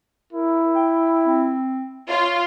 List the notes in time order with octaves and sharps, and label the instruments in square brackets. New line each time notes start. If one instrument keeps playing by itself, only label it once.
[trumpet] E4 [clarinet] A#4
[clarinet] G5
C4
[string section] F4 [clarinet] C#5